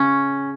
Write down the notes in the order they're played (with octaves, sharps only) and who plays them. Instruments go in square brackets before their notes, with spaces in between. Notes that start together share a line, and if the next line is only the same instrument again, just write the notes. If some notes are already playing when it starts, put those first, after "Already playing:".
Already playing: [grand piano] C#3 [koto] C#4